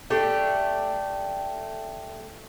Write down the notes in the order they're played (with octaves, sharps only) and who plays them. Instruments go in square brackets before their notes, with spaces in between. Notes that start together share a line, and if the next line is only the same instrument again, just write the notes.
[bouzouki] A3 D4 G4